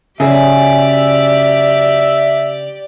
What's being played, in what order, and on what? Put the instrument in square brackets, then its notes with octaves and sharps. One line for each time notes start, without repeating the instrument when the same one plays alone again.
[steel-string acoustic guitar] F#2 F#3 G#4 [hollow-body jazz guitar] C#3 [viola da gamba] G4 D5 [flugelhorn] E5